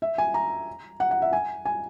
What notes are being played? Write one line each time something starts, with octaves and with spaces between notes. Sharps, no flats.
E5
G#5
A#5
F#5
F#5
E5
G#5
G#5